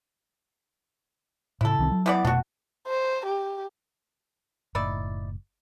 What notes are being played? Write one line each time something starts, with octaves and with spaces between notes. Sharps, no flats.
A2 C#3 E4 A4
C2 D#3 C4
F#3
E3 B3 D5
F1 B2 A3 D4 F#4
C5
G4
F#1 A2 D#4 E4 D5